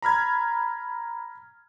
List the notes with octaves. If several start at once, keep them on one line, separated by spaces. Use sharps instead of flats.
A#5 B5 F6 G#6